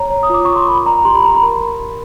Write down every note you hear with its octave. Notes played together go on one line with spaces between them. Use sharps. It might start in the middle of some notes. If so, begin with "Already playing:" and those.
Already playing: C#5 A#5
C#5
D#6
F4 D6
F4 C#6
C6
A#4 B5
D5 A#5
G4 C6
B5
G4 A#5
B5
A#4